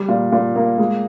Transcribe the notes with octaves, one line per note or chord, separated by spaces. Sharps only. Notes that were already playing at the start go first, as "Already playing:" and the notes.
Already playing: G3
A#2
A#2
A#3
G#3